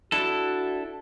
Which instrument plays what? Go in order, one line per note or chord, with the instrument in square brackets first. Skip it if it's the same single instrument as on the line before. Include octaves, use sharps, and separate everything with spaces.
[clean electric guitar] D4 E4 A4 [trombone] F#4